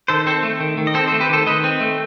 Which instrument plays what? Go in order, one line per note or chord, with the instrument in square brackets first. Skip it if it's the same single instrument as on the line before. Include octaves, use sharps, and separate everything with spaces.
[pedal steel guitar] D#3 A4 C5
C4 A4 C5
A3
D#3
D#3
D#5
C4 A4 C5
A3 A4 C5
G4 B4
D#3 A4 C5
D#3 B4 D#5
C4
A3